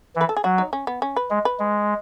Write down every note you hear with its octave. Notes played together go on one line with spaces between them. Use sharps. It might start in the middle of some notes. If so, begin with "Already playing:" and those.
E3
B4
A4
G#4
F#3 F#4
D#4
C#4
B3
C#4
B4
G#3
B4
G#3